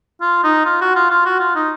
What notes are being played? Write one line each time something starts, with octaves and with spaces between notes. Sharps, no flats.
F4
D#4
F4
F#4
F4
F4
F#4
F4
D#4